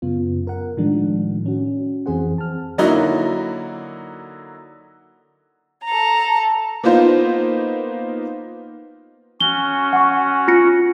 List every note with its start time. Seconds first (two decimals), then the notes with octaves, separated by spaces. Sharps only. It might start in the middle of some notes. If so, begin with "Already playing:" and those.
0.02 F#2 C#3 B3 F4
0.47 A#4 F#5
0.77 A2 D#3 F3 G#3 D4
1.46 C#4 F#4
2.06 F2 E3 C4 G#4 C5 F#5
2.38 A5 F6
2.78 D3 F#3 A#3 D#4 E4 F#4
5.85 A4 A#5
6.84 A#3 B3 D#4 F4 C5
9.40 C#4 F#4 G7
9.93 F#5 C#6
10.48 F4 A#6 C#7